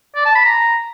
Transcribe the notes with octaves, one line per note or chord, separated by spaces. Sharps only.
D5
A5
B5
A#5